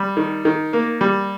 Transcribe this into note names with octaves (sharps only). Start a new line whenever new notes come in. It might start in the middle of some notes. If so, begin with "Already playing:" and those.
Already playing: G3
D#3
D#3
A#3
G3